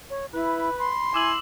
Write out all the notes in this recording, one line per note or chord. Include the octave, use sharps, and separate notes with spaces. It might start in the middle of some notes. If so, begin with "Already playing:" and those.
C#5
E4 B4 B5
C6
E4 G#5 D6 E6 F#7